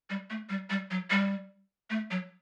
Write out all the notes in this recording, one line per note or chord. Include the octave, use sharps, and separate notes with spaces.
G3
A3
G3
G3
F#3
G3
A3
F#3